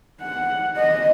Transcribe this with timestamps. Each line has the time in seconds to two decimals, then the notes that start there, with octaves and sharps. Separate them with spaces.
0.22 F#5
0.77 D#5